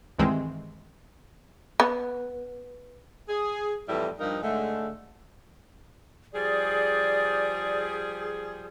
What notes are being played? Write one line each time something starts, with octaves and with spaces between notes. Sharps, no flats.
C2 G2 D#3 E3 G#3 C4
B3
G#4
F2 A2 E3 G3 A3 E4
G2 F3 G3 D#4 A#4 F5
G#2 D3 G#3 A3
F3 G3 G#4 D5